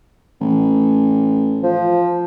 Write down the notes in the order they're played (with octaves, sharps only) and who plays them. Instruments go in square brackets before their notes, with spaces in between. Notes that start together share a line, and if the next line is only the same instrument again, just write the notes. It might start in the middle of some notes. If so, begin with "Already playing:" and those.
[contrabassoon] A1
[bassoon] F3